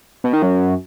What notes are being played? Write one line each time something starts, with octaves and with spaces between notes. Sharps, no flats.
B2
D#3
F#2